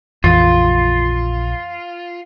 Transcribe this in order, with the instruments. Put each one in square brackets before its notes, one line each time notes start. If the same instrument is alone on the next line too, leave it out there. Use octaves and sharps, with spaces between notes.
[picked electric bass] A#1 [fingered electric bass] F2 E3 [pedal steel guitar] F4